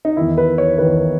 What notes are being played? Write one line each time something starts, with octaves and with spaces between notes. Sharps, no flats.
D#4
E2 D#3 E4
B4
C#5
E2 D#3 B4